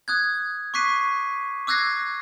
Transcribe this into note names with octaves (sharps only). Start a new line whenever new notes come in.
D#6 F#6 G#6
C#6 D6 F#6 B6 C7 D#7
D6 E6 F#6 G#6 A#6 C7